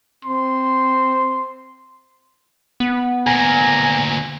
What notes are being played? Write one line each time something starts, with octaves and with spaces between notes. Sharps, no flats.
C4 C6
B3
D2 A#2 G#5 A#5